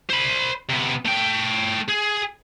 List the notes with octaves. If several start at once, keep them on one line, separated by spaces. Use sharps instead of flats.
C5 B5
C3 B3
A3 G5
G#4